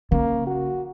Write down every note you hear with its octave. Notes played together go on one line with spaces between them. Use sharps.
C#3 A#3
F#4